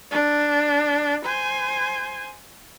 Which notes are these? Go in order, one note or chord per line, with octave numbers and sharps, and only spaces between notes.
D4
C5 G#5